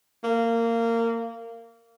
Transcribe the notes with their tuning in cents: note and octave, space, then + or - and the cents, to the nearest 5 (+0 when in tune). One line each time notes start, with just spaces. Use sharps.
A#3 -20